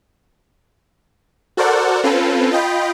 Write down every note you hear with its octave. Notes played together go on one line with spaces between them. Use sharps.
F#4 A4 A#4 C5 D5 F#5
C4 C#4 F4 A4 B4
F4 D#5 G5 B5